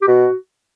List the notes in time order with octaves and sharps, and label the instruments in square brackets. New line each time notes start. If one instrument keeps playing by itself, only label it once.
[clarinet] G4
[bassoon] B2 [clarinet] F#4